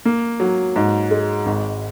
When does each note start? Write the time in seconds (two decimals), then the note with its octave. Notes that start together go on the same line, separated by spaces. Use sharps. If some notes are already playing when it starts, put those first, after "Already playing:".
0.05 A#3
0.40 F#3
0.76 G#2
1.11 G#3
1.46 G#1